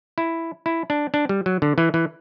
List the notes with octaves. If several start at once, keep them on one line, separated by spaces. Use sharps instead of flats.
E4
E4
D4
D4
G3
F#3
D3
E3
E3